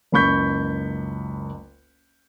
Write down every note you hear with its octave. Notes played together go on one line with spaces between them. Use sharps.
F#1 C#2 B5 C#6 G6 B6